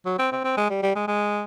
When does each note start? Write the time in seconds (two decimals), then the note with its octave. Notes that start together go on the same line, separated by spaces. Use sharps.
0.06 F#3
0.19 C4
0.32 C4
0.44 C4
0.57 G#3
0.70 G3
0.83 G3
0.95 G#3
1.08 G#3